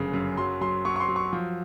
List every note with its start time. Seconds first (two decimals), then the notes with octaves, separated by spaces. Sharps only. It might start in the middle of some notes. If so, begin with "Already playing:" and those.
Already playing: G1 F#2 C#3
0.14 F#2
0.37 F#3 C6
0.61 F#3 C6
0.85 F#3 C#6
0.96 C#6
1.00 C6
1.08 F#3
1.16 C#6
1.33 F3